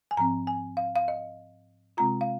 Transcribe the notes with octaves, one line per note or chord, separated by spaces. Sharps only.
G#5
G#2 F3 C4 A#5
G#5
F5
F5
D#5
C3 G#3 C4 F4 A#5
F5